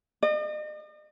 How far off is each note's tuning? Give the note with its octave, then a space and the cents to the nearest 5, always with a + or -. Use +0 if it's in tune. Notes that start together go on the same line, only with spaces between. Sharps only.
D#5 -45